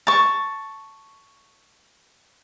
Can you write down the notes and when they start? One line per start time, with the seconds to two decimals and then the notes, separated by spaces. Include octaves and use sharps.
0.07 A5 C#6